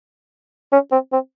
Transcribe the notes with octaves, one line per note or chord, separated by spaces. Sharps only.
C#4
C4
C4